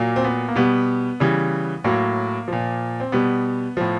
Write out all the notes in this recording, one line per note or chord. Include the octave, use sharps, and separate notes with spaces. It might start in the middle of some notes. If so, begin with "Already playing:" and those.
Already playing: A#2 F#3 A#3
C4
B3
A#3
B2 G3 B3
C#3 E3 G3
A2 F#3 A#3
A#2 F3
C4
B2 G3 B3
A2 F3